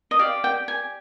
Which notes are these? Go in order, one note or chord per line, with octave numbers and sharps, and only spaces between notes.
D#5
G4 D5 F5
G5
G#5